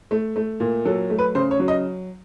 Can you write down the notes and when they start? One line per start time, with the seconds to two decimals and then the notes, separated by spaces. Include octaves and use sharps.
0.11 A3
0.36 A3
0.60 A#2
0.85 F#3 A4
1.10 A3
1.18 B4
1.35 C#3 C5
1.51 C#5
1.60 F#3
1.68 D#5